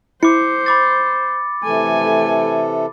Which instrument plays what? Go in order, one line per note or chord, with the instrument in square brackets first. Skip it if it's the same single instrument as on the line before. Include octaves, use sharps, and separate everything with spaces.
[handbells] E4 [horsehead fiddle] C5 [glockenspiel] D6 C#7
[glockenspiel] B5 D6 A6
[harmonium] C3 E3 A4 [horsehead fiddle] A3 G#5